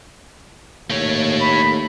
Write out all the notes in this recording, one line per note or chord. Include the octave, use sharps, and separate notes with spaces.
D#2 A3 C#5
B5